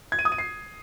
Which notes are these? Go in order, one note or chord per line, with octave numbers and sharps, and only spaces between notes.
G#6
D#7
D#6
D#7
C7